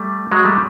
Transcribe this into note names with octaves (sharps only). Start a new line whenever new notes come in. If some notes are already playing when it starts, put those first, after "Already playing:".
Already playing: G3 A3
F#3 G#3
G3 A3